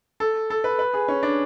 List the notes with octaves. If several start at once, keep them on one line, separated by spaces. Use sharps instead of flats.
A4
A4
B4
B4
G#4
C#4
D4